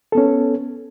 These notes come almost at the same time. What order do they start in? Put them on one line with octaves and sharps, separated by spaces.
A4 B3 C#4